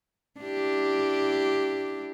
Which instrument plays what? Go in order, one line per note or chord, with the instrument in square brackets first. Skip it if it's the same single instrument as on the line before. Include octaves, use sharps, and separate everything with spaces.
[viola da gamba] D4 E4 G4